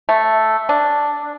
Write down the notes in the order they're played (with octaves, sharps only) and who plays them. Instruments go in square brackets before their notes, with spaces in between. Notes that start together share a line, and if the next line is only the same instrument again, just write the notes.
[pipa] A3
D4